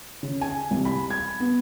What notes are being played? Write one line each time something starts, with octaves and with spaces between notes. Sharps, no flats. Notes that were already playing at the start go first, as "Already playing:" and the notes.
C#3
G#5
C2
B5
G#6
B3